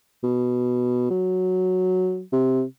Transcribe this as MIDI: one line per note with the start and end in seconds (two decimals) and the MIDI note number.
0.24 1.07 47
1.10 2.22 54
2.33 2.63 48